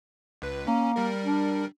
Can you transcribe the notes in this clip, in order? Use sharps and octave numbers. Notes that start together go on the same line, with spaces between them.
C#2 B4
A#3 C#4
G3 A#4
D4